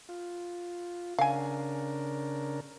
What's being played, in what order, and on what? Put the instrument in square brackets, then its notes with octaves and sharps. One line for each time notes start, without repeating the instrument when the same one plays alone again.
[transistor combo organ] F4
[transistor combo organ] C#3 D4 A#4 [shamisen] F5 G#5